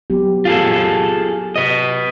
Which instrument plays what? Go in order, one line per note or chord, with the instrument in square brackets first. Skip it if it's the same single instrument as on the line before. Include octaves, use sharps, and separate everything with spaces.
[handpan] F#3 B3 G4
[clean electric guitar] F4 G#4 A4
B4 D#5